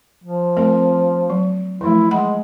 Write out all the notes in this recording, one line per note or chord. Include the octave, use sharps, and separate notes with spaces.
F3
A3 C4 A#4
F#3
E3 F3 A3 E4
G#3 F#5 B5